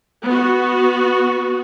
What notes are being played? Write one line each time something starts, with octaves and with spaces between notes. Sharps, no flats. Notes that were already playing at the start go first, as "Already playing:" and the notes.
B3 F#4